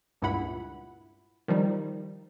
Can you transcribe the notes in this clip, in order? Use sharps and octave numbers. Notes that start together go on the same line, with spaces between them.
C#2 G2 A#2 E4 F#5 B5
D#3 F3 G3 D#4